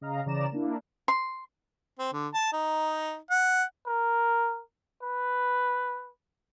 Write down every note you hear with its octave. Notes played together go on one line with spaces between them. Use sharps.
C#3 D#5 F5 A#5
C#3 E3 D5 A#5 E7
A#3 D4 E4
C6
C4
D3
A5
D#4
F#5
A#4
B4